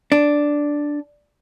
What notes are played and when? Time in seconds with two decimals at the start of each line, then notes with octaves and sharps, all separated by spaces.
0.12 D4